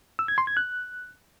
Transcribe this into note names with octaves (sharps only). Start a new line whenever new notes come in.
E6
G#6
C6
G#6
F#6